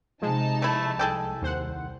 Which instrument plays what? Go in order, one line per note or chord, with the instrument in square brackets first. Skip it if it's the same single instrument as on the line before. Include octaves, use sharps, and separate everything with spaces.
[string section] C3 D#4 A5 [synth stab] F3 G#3
[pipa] A3 E4
[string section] C2 [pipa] G#4 A4 G5
[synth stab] D#2 C5 F#5